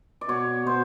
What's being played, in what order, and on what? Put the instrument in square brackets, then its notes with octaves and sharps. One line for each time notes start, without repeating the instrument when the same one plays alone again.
[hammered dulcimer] D5
[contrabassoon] B2 [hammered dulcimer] C#5
[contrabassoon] B2 [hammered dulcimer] C5